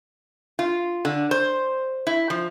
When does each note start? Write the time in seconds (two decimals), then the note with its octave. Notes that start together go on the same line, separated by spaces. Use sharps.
0.59 F4
1.05 D3
1.31 C5
2.07 E4
2.30 F3